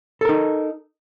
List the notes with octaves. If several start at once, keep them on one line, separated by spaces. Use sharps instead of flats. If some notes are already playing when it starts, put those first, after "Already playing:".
D#4 A4 A#4